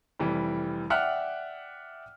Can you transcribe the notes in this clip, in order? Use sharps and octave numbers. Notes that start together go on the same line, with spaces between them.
F1 E3 G3
D5 E5 F#5 G5 F6 F#6